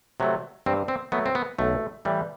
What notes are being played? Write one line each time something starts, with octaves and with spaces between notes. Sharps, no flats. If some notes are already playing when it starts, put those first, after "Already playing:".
C3 F#3 A3
G2 C4
C4
F#3 A3 B3
C4
B3
B1 A3
A2 E3 G3